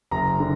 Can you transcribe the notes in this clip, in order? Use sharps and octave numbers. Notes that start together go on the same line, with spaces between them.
F#1 A#5
D3